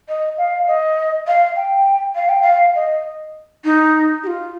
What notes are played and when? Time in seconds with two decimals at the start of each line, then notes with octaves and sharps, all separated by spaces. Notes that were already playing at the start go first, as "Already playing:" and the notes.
0.08 D#5
0.38 F5
0.67 D#5
1.27 F5
1.56 G5
2.15 F5
2.29 G5
2.42 F5
2.75 D#5
3.64 D#4
4.23 G4
4.27 F4